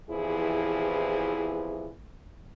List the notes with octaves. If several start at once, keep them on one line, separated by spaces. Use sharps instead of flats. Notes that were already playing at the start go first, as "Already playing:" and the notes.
E2 C3 E3 F3 E4 G#4